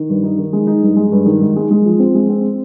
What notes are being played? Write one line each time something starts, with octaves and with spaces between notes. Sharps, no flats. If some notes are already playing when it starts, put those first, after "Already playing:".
Already playing: D#3
G2
D#4
D#3
G#3
D#4
G2
G#3
G2
D#3
G#2
G#3
G#3
F3
C4
G#3
C4